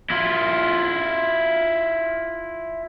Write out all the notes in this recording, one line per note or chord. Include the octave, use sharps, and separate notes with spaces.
E4 F4